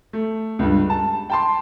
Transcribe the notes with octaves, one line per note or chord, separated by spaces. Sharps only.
A3
C#2 G2
A5
G5 A5 C6